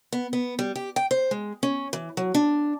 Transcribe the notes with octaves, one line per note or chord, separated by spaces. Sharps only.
B3
B3
G3
G4
G5
C5
G#3
C#4
E3
F#3
D4